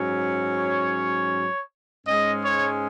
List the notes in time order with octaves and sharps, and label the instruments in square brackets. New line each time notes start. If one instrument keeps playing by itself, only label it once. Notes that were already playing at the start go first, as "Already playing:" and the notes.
Already playing: [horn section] G#2 F#3 C#4
C#5
G#2 G#3 C#4 D#5
C#5